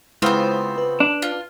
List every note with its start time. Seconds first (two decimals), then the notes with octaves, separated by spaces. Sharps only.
0.22 C#3 G#3 B3 C4 E4 F4 C5
0.78 B4
1.00 D4
1.22 F4